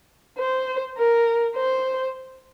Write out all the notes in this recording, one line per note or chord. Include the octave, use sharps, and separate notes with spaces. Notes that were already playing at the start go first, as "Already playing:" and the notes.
C5
A#4
C5